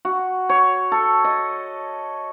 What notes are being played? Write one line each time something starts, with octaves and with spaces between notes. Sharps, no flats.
F#4
C#5
A4
D#5